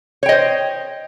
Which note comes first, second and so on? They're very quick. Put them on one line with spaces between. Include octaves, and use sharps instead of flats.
C#5 G5 D#5 C5